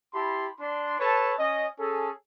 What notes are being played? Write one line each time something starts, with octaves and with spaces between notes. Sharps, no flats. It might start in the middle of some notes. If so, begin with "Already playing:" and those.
E4 G4 A5 B5 C6
D4 C6
A4 B4 C#5 A5
C#4 D#5
C#4 G#4 A4